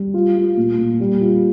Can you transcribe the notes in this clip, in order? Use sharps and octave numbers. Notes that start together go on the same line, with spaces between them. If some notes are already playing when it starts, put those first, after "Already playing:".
Already playing: G3
F4
F4
A#2
A#2
G3
F4